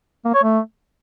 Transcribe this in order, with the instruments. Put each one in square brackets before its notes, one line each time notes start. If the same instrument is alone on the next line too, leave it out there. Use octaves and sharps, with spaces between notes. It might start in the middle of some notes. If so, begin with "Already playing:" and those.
[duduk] A#3
C#5
A3